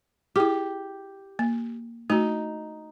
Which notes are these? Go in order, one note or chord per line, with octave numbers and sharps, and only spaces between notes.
E4 G4 G#4
A#3
A3 D#4 F#4